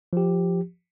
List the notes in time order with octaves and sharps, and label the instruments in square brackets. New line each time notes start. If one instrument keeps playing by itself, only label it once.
[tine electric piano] F3 G4